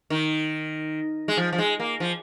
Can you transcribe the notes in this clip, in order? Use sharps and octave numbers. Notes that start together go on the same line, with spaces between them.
D#3
G#3
F3
F3
G#3
A#3
F3